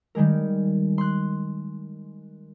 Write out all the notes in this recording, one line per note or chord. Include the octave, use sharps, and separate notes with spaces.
D#3 G3 G#3 A#4
C6 F#6